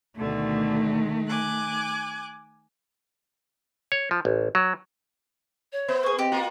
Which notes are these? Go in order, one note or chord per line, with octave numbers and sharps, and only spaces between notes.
D2 B2 D3 D#3 A3
G#5 D6 F#6
C#5
F3
A1
F#3
C#5
B3 C5 E5
A#3 G#4 C#6
C4 G4 D#5
A#3 F4 F#4